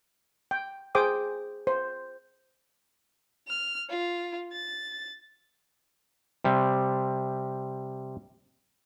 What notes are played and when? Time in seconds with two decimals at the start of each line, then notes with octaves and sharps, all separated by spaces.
0.51 G5
0.95 G#4 C5 G5 D6 D#6
1.67 C5
3.48 F6
3.90 F4
4.52 A6
6.44 C3 G3